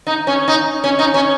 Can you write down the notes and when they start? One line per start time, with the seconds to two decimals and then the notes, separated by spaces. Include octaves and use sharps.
0.07 D#4
0.27 C#4
0.48 D#4
0.84 C#4
0.99 D#4
1.14 C#4